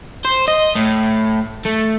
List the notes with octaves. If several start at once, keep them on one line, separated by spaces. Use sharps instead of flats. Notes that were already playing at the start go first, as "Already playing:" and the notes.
C5
D#5
A2
A3